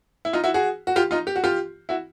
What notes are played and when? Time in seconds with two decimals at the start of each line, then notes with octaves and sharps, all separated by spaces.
0.25 E4
0.33 D#4 F4
0.44 E4 F#4
0.54 F#4 G#4
0.87 F#4
0.96 F4 G4
1.11 D#4 F4
1.27 G4
1.36 F#4
1.44 F4 G4
1.89 E4 F#4